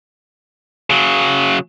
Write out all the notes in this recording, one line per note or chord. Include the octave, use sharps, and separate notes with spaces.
C#3 F#3